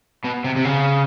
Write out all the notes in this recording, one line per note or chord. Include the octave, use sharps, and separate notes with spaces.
B2
C3
C3
C#3